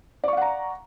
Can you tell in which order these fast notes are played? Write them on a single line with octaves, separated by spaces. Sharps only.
D5 C#6 F5 F#5 A#5